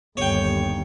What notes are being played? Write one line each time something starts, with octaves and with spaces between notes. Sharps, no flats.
G1 D#2 C#5 G5